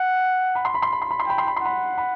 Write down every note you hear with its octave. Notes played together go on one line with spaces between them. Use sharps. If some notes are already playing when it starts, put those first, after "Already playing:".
Already playing: F#5
B5
C6
B5
C6
B5
C6
B5
C6
G5 B5
C6
B5
C6
F#5 B5
B5